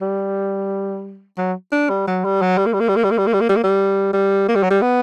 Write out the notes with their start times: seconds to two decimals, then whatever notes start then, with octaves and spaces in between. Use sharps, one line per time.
0.01 G3
1.37 F#3
1.72 D4
1.89 G3
2.07 F#3
2.24 G3
2.42 F#3
2.58 G3
2.66 A#3
2.73 G3
2.80 A#3
2.88 G3
2.96 A#3
3.04 G3
3.11 A#3
3.18 G3
3.26 A#3
3.33 G3
3.41 A#3
3.49 G3
3.56 A#3
3.63 G3
4.13 G3
4.48 A#3
4.55 G3
4.63 F#3
4.71 G3
4.81 B3